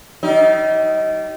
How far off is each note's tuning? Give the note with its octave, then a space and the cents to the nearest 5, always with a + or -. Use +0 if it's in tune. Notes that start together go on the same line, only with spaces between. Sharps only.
G3 -30 D#4 +25